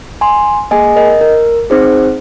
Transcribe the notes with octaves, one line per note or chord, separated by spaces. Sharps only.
G#5 C6
A#3 G#4 D#5 G#5
A#4 D#5
A#4
C4 D#4 G#4 C5